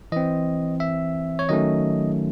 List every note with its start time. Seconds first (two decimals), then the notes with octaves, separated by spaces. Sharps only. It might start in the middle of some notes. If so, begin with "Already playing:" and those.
0.12 E3 C4 D#5
0.80 E5
1.39 C#5
1.49 D#3 F#3 A3 C#4 D#5